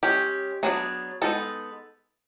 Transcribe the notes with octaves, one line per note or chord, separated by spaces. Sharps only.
G#3 C#4 G4
F#3 B3 D4 G#4
G#3 B3 D#4 A4